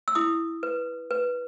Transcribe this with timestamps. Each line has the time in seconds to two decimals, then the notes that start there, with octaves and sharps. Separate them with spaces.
0.08 E6
0.15 E4 D#6
0.63 B4
1.11 B4